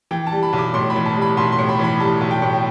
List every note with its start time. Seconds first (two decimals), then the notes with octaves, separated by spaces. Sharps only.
0.11 E3 G5
0.27 A5
0.32 G3
0.43 B5
0.53 B1
0.58 D6
0.74 A2 C6
0.90 B5
0.95 E3
1.06 A5
1.16 G3
1.22 B5
1.37 B1 C6
1.52 C6
1.58 A2
1.69 B5
1.79 E3 B5
2.00 G3 A5
2.21 B1
2.31 G5
2.42 A2